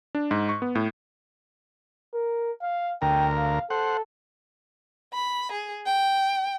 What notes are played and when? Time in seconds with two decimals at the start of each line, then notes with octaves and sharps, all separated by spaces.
0.15 D4
0.31 G#2
0.49 C#6
0.62 B3
0.75 A2
2.14 A#4
2.62 F5
3.02 D2 A#4 G5
3.38 F5
3.70 A4 C5 F#5
5.13 B5
5.52 G#4
5.86 G5